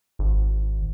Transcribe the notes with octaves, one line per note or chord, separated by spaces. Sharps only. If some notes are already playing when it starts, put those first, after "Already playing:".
G#1